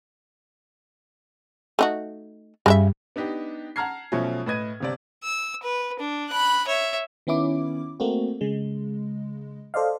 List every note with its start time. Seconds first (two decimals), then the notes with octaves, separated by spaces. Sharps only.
1.79 A3 D#4 F#4
2.66 G2 C#3 G3 D4 E5
3.16 B3 D4 D#4 G4
3.76 F#5 A5 A#5 F6 G#6 C7
4.12 B2 F3 F#3 A3 C#4
4.46 A2 B4 D#5 G#6 D#7
4.80 G1 C3 D5
5.23 E6
5.63 B4
5.99 D4
6.30 B5 F#6
6.67 C#5 E5
7.27 D#3 B3 C#4 E4 D6
8.00 A3 A#3 C4 F#4
8.41 C#3 G#3
9.74 A4 C5 D5 D#5 F5